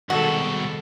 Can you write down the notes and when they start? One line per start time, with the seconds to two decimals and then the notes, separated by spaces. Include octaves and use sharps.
0.10 C2 B2 D#3 G#3 F#4 A4